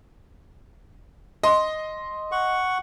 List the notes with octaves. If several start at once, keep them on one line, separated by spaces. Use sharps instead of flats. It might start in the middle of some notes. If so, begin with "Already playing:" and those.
D#5 C6
F#5 C#6